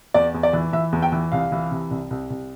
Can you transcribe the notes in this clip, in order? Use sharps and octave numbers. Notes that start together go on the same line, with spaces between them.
E2 D5
E2
D5
E3
E3 E5
E2
G5
E3
C2 F5
E3
C3
C2
C2
C2